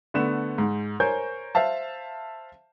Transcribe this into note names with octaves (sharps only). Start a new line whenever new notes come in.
D3 A3 B3 E7
G#2
A#4 C5 C#5 G#5 G6
C5 E5 F5 A5